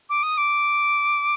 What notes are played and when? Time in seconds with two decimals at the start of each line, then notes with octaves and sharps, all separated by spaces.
0.10 D6
0.23 D#6
0.38 D6